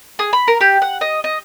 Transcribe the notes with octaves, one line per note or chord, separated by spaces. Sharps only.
G#4
B5
A#4
G4
F#5
D#5
D#5